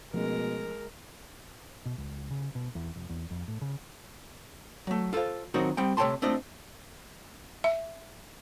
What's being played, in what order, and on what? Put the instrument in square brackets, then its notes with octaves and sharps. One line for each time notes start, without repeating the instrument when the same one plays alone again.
[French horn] B2 [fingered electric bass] F3 A3 C#4 [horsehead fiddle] G#3 [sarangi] A#4
[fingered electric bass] B2
C#2
C#3
B2
E2
F1
E2
F2
A2
C#3
[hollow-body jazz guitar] F#3 A3
F4 A4 B4 C5 F5
D#3 F#3 C4 D#4 F#4 A#4
G3 C4 G5
C3 A3 C#5 G5 A5 C6
A3 C4 D4 F4 D#5
[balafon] E5